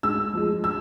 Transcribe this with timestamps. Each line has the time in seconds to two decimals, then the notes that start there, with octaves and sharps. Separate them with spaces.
0.03 G#2 E6
0.34 F3 G#3
0.64 E6